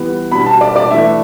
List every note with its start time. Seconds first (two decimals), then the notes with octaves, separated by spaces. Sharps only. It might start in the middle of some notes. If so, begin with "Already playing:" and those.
Already playing: E3 G3 B3
0.32 B2 G3 D4 B5
0.46 A5
0.61 D5
0.76 D5
0.90 E3 A3 D4 E5